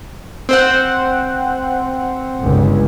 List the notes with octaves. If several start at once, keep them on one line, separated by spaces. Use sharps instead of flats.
C4 C5 F#5
G1 C#2